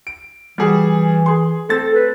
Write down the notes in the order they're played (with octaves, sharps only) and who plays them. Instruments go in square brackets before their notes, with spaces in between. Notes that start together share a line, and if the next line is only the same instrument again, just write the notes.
[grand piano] D7
[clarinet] E3 [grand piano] G3 F#4 G#4
[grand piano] G#4 C6
[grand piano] A3 C4 A6 [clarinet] A4
[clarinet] B4